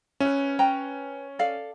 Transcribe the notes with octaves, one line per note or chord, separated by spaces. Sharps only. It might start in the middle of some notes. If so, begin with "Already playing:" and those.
C#4 B4 E5
B4 G5 A#5
A4 D5 F5